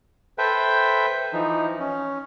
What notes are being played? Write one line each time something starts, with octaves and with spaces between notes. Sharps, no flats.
A4 B4 C5 E5 G5
E3 F3 D#4
C#4